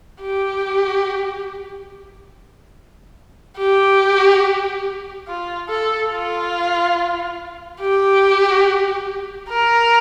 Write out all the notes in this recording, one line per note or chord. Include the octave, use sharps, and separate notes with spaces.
G4
G4
F4
A4
F4
G4
A#4